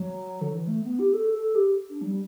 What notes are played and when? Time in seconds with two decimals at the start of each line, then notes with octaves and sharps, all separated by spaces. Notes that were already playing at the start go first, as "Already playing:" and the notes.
Already playing: F#3
0.41 D3
0.53 E3
0.67 A3
0.84 B3
0.99 G4
1.13 A4
1.34 A4
1.55 G4
1.90 D4
2.02 F#3
2.06 G3